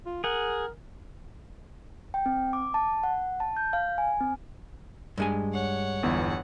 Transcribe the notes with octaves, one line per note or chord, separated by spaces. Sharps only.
F4
G#4 A#4 F#5
G5
C4
D6
A5
F#5
A5
G6
F5
G#5
C4
G2 G#3 G#5
C#5 F#5
G1 E2